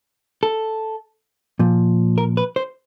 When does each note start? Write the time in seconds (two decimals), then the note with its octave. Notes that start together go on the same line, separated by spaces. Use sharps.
0.43 A4
1.59 A#2 F3
2.18 A#4
2.37 B4
2.56 C5